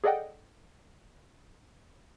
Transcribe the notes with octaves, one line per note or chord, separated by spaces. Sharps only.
G#4 A4 D5 D#5 F#5 G5